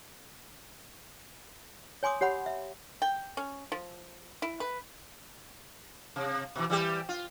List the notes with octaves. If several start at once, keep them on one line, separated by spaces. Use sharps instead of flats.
C#5 G#5 C6 D6 D#6
G4 C#5 F#5 B5
E5
G5
C#4
F3
E4
B4
C3
B2 E3
E3 G3 G4
F4